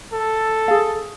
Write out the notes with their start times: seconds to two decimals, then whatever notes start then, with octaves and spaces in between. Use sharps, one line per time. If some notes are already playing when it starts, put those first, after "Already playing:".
0.13 A4
0.68 G#4 F5